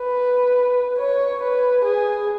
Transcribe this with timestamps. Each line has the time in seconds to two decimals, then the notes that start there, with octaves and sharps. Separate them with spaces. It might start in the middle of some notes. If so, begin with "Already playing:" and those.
Already playing: B4
0.99 C#5
1.41 B4
1.84 G#4